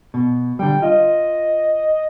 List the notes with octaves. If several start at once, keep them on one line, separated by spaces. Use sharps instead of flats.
B2
D3 G3 G5
F4 D#5